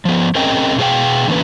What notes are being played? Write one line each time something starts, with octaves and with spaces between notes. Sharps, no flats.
F3 B3
C4 C#4 G#4 A#4 D#5 G5
B2 F#4 G#4 C5 F5 G5
D3 E3 A#3 C#4 B4